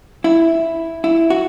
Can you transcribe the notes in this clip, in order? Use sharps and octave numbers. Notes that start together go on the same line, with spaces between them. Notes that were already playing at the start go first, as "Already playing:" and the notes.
E4
E4
F#4